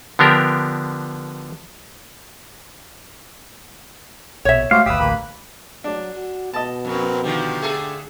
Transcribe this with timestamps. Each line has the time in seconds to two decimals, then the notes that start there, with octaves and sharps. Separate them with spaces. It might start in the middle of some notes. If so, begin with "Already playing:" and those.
0.19 D3 F3 B3 D4 G4 A#4
4.45 A#1 B2 C#5 E5
4.71 G#3 A3 F#4 G4 C5 F5
4.86 G1 D2 G4 B4 F5 D#6 E6
5.00 A1 D2 A#3 B5
5.84 F#3 D4
6.14 F#4
6.54 B2 D#5 A5
6.85 F2 C4 A#4 B4
7.23 D3 D#3 F3 G4
7.61 A3 G#4 A4